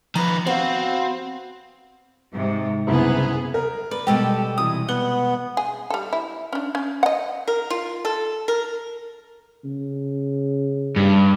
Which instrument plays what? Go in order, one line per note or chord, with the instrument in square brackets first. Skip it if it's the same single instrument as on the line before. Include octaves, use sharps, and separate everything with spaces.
[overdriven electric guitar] D#3 B4 [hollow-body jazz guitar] F3 [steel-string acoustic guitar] A#5
[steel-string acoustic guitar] B3 F#4 [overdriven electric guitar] C4 [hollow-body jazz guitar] C5 F5
[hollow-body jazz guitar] F5
[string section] G#2 C3
[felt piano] F#1 C2 [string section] B3 G#4
[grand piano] A#4
[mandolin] B4 [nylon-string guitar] D5
[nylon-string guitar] B2 G3 G#3 [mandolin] G4 A4 [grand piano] B4
[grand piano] C3 E3 [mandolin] D#6
[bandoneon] B3 [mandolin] F#5 [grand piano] G7
[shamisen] G#4
G3 A4
E4
C#4 D4
C#4
D#5 F#5
[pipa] A#4
F4
A4
A#4
[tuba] C#3
[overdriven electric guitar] G2